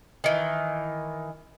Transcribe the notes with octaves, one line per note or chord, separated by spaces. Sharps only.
D#3 E3